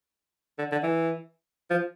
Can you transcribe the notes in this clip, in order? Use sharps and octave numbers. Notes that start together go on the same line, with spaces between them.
D3
D3
E3
F3